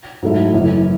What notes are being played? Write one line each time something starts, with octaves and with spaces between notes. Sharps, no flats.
G#2 F#3 A3 E4
F#1 F#2 E3